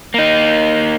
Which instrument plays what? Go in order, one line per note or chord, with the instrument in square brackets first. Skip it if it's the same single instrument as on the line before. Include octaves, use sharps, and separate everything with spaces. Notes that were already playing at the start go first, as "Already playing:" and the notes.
[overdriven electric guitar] A#3 D#4